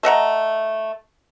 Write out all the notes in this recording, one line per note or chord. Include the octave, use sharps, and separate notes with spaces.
A3 D#5 F#5 A#5